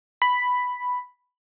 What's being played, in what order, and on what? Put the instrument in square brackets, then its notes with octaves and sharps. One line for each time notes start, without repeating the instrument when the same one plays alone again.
[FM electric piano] B5